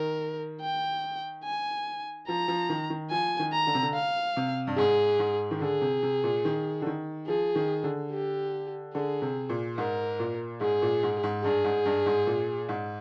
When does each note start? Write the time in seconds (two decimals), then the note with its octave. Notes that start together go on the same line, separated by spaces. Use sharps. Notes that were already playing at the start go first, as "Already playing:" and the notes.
Already playing: D#3 A#4
0.61 G5
1.45 G#5
2.28 F3 A#5
2.48 F3
2.69 D#3
2.90 D#3
3.11 F3 G#5
3.39 D#3
3.53 A#5
3.67 D3
3.75 C3
3.83 D3
3.94 F5
4.37 C3
4.67 G2
4.77 G#2 G#4
5.19 G#2
5.51 D#3
5.61 D3 G#4
5.81 C3
6.03 C3
6.24 A#2
6.45 D#3
6.82 D3
6.86 D#3
7.27 F3 G#4
7.55 D#3
7.83 D3
8.11 G4
8.94 D3 G#4
9.22 C3
9.49 A#2
9.78 G#2 A#4
10.19 A#2
10.61 G#2 G#4
10.82 A#2
11.03 G#2
11.23 G#2
11.44 G2 G#4
11.64 G#2
11.85 G2
12.06 G#2
12.27 A#2
12.69 G#2